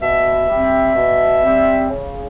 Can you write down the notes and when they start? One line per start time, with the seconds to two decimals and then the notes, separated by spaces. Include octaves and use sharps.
0.01 B2 E5
0.49 G3 C4
0.95 B2
1.43 G3 C4
1.90 C#3